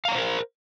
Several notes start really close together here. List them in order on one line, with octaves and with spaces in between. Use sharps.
F5 A#5 C#5 C5 A#4